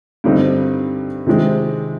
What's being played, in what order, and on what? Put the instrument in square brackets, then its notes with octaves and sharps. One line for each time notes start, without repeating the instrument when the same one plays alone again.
[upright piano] G2 D3 G3 C4 D#4
C3 D#3 G#3 C4